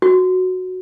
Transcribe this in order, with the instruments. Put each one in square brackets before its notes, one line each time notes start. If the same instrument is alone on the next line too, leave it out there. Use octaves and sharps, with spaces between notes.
[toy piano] F#4